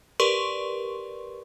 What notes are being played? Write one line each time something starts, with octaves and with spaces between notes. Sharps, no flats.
G4 A#4 B4 D5 C6 C#6